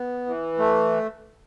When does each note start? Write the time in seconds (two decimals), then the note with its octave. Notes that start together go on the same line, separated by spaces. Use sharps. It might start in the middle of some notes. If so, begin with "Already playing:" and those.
Already playing: B3
0.26 E3
0.58 A3